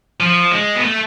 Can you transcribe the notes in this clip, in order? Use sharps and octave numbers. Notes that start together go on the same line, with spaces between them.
F3
G#3
B3
A3